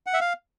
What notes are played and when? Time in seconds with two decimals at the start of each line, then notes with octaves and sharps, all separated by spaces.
0.07 F#5
0.13 E5
0.20 F5